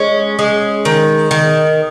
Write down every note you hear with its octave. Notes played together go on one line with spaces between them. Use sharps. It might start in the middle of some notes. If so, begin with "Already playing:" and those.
Already playing: G#3 C#4
G#3
D#3
D#3